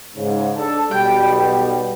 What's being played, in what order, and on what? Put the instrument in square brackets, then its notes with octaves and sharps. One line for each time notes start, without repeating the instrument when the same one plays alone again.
[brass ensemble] G#2 C#3
D4 A4 A5
[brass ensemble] B1 B2 G3 [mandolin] G5